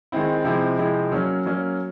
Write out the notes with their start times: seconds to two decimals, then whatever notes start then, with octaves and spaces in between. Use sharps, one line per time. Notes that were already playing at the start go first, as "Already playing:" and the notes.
0.12 D#3 G#3 C4 E4
0.45 C3 F3 G#3 C4 E4
0.78 C3 F3 G#3 C4 E4
1.12 F#3 A#3 C#4
1.46 F#3 A#3 C#4